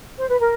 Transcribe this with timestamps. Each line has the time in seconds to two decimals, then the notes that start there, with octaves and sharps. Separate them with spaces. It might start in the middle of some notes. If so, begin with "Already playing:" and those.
0.18 C5
0.29 B4
0.39 A#4